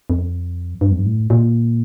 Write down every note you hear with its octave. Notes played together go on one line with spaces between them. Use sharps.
F2
G2
F2
G2
A2
A#2